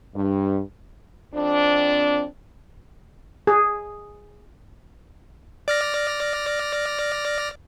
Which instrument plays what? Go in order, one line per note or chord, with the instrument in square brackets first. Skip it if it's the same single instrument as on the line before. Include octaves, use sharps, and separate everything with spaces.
[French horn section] G2
F2 C4 D4
[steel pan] G#4
[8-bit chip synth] D5 F6 A#6